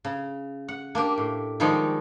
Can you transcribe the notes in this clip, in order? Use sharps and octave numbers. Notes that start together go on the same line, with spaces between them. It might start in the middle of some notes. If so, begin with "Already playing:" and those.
C#3
F#5
A#3 D4 G4
A2
D#3 F3 G3 G#3 D#4 C#5